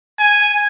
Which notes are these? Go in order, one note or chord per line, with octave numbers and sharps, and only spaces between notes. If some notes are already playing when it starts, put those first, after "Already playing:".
G#5